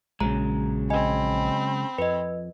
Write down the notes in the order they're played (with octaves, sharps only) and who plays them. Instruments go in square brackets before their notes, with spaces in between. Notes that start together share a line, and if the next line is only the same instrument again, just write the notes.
[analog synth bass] A#1 [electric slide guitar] C#3 F#3 G#3 [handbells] A#5
[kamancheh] C4 B5 [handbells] D#5 G#5
[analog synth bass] F2 [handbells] B4 D#5